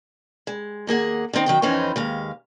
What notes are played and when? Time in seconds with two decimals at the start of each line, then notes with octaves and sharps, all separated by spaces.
0.47 G#3
0.87 D#2 A#3 G#4 F#5
1.33 D3 D#3 C4 D#4
1.46 D#3 F#3 G5
1.62 F2 E3 C#4 D#4 C5
1.96 D#2 G#3 F5